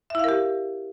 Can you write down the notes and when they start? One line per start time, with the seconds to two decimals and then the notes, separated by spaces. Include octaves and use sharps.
0.10 E5
0.15 E4
0.19 F5
0.24 A#4
0.29 G4